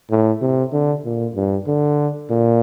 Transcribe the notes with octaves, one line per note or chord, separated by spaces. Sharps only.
A2
C3
D3
A#2
G2
D3
A#2